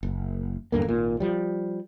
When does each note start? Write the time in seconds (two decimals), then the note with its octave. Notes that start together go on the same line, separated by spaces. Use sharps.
0.03 F#1
0.72 E2 G2 D3 A#3
0.85 G#1 A#2
1.20 F3 G3